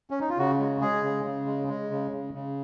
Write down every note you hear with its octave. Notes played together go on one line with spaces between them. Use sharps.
C#4
D#4
F4
C#3 F#4
G#3
G#3 G#4
C#3
C#3
G#3
G#3
C#3
C#3
C#3